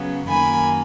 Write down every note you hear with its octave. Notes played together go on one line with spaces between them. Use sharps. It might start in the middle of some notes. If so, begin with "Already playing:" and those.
Already playing: C#3 F#3 B3
F#2 D#3 A#3 G#5 B5